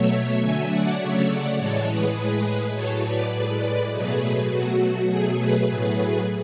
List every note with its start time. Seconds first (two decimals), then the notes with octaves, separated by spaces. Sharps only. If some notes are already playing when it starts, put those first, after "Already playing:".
Already playing: B2 F#3 A3 C#5 E5
0.40 D3 F#3 A3 E5 G#5
0.69 D5 F#5
0.98 C#3 F#3 A3 C#5 E5
1.28 D5 F#5
1.57 A2 E3 G#3 A4 C#5
1.86 G#4 B4
2.15 A2 G#3 G#4 B4
2.73 A2 F#3 A3 A4 C#5
3.02 B4 D5
3.32 A2 G#3
3.90 B2 F#3 A3 G#4 B4
4.49 B2 F#3 A3 F#4
5.07 B2 F#3 A3 G#4
5.36 G#4 B4
5.65 A2 F#3 A3 G#4 B4